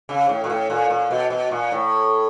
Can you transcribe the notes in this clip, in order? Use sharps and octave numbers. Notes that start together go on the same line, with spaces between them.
C#3
A2
A#2
A2
A#2
A#2
B2
B2
A#2
A2